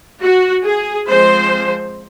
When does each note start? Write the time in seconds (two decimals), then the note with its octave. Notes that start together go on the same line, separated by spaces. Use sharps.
0.21 F#4
0.65 G#4
1.08 F3 G#3 C4 C5